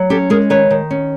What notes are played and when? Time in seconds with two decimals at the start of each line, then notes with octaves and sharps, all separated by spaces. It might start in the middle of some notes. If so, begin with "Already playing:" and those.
Already playing: F#3
0.10 C#4 G4 A4
0.30 G#3 G#4 A#4
0.50 D#3 B4 C#5
0.71 D#3
0.91 C#4